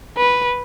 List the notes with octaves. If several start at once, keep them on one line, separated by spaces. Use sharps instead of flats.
B4